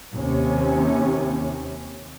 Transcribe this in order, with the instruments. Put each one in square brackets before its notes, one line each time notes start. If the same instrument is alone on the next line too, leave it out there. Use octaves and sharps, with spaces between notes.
[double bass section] D#2 C3 C#4